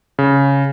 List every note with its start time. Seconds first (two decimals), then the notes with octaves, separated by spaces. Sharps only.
0.19 C#3